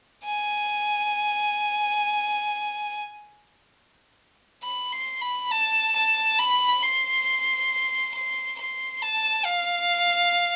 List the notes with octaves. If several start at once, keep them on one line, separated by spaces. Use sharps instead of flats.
G#5
B5
C6
B5
A5
A5
B5
C6
C6
C6
A5
F5